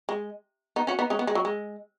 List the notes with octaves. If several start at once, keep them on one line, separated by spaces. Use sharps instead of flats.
G#3
B3 D#4
C#4 F#4
B3 D#4
G#3 C#4
B3
G#3
F#3
G#3